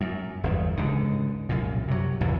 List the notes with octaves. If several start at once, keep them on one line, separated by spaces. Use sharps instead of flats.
F#2
G1 E2 G#2
C#2 G#2 D3
C2 F#2 A#2
C3 F#3
A#1 E2 A2 C#3